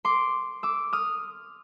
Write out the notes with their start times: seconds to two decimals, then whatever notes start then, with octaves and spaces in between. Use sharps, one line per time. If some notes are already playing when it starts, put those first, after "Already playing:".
0.05 C6 D6
0.63 D6 E6
0.93 D#6 F6